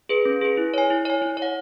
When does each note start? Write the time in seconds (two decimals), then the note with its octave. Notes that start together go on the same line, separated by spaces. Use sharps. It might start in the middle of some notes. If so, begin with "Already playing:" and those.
0.09 G#4 B4
0.25 C#4
0.41 G#4 B4
0.57 E4
0.74 C#5 G#5
0.90 E4
1.05 C#5 G#5
1.22 E4
1.37 C#5 F#5